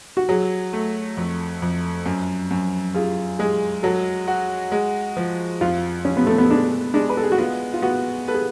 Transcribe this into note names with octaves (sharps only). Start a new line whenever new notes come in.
F#4
F#3 G#4
A3
F2
F2
F#2
F#2
F4 G#4
G#3 G#4
F#3 A4
F#4
G#3
F3
F2 F4
F2 C#4
B3
A3
B3
G#3 D4
G#3 D4
B4
A4
G#4
F#4
B3 F4
F4
B3 F#4
A4 B4
G#4